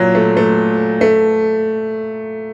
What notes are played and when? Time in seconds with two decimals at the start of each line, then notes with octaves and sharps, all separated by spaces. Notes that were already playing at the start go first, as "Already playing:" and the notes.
Already playing: A#2 F#3
0.15 A3
0.37 A3
1.01 A3